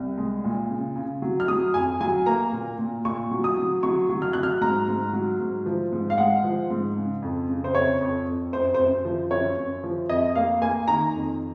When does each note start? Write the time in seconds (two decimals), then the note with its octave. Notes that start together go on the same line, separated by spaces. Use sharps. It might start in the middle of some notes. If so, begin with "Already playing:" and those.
Already playing: C2
0.18 G#3
0.44 A#2
0.70 C#3
0.96 C#3
1.22 F#3
1.40 F6
1.48 F#3 D#6
1.74 F2 G#5
2.01 F#3 G#5
2.26 A#3 A#5
2.53 A#2
2.78 A#2
3.05 A#2 C#6
3.31 F#3
3.44 D#6
3.57 F#3
3.83 F#3 C#6
4.09 F#3
4.22 F6
4.33 F#3 F#6
4.43 F6
4.61 G#2 A#5
4.88 G#2
5.13 F#3
5.40 G#2
5.66 F3
5.92 G#2
6.10 F5
6.18 G#3 F#5
6.44 F3
6.70 G#2
6.96 C#3
7.22 F2
7.48 C#3
7.64 C5
7.75 F2 C#5
8.01 F2
8.27 F2
8.53 F#2 C5
8.74 C5
8.79 F#2
9.05 F3
9.31 F#2 C#5
9.57 F#2
9.84 F3
10.09 F2 D#5
10.35 A#3 F5
10.62 A#3 G#5
10.88 D#3 A#5
11.14 F2